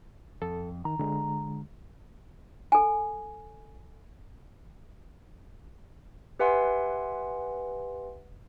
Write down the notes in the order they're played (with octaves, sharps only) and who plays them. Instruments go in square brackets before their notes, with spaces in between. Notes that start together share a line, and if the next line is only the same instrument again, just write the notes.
[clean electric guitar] F2 [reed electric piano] A4
[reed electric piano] D#3 [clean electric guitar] A#5
[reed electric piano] D3 G#3
[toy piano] A4 G#5
[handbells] G4 B4 E5 F#5 G#5 C6